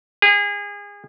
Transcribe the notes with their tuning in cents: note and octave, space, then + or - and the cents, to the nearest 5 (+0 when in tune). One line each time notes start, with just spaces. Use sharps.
G#4 -30